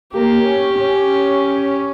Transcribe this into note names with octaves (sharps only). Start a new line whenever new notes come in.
A#3 G4
C#4
C#4